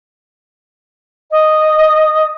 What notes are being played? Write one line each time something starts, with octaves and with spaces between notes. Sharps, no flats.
D#5 D#6